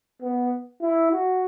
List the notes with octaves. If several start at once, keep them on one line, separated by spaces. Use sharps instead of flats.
B3
E4
F#4